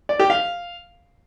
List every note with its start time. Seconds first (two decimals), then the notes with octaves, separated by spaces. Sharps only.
0.09 D5
0.20 G4
0.30 F5